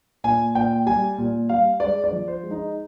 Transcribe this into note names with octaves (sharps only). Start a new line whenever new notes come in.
A#2 G#5
A#2 G5
G3 G#5
A#2
G3 F5
G#3 D5
D5
F3
C5
G#3
D#4